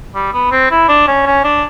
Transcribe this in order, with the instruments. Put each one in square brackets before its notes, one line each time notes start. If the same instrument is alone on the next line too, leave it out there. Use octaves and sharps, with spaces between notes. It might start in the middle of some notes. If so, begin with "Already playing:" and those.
[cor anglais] G3
B3
C4
E4
D4
C#4
C#4
D4